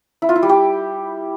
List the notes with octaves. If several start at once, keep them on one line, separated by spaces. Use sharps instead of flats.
E4
F4
E4
G3
G4